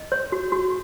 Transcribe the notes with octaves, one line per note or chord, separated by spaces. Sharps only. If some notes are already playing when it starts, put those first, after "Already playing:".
Already playing: D#5
C#5
F#4
F#4